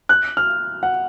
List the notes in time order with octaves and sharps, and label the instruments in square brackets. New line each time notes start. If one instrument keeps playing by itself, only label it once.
[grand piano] F#6
F6
F#5